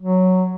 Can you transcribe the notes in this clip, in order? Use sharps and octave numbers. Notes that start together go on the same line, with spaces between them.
F#3